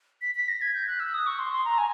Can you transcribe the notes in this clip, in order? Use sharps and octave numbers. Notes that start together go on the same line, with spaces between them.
B6
B6
A#6
G#6
G6
F#6
E6
D#6
C#6
C6
C6
A#5
G#5